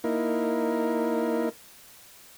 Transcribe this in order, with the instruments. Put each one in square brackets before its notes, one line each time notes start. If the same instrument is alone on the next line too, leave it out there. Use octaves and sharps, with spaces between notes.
[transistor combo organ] A#3 D#4 E4 A#4